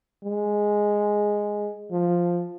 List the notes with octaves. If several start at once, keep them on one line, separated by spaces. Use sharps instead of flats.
G#3
F3